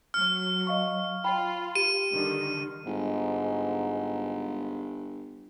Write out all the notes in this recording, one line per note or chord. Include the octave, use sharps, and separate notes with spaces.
F#3 F6
D#5 F5 C#6
F4 G5 B5
G4 D#7
D3 D#3 G3
G1 G#2